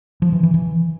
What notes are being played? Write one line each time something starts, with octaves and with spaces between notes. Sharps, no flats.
F3
E3
E3
E3